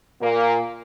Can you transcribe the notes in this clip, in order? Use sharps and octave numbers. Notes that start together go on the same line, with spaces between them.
A#2 A#3